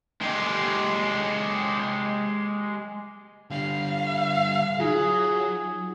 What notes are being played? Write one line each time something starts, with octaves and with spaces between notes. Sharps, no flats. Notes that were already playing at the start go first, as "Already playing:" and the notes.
G#3 G4
D3 G3 F5
F#3 D#4 F4 G#4